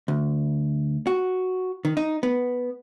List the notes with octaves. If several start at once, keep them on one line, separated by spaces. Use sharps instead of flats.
D2
F#4
D#3
D#4
B3